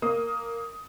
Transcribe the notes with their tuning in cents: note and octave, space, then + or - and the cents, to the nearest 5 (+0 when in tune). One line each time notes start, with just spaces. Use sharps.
A#3 -5 D#6 +10